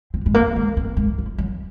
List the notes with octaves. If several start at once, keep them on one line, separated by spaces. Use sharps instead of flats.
C4
G#3
A#3
G#3
C4
G#3
F3
F#3